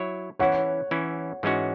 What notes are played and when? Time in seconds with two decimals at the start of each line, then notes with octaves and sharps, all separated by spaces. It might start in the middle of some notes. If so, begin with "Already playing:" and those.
Already playing: F#3 E4 C#5
0.39 E3 C#4 E4 C#5 F#5
0.91 E3 C#4 E4
1.43 G#2 E3 G#3 C#4 F#4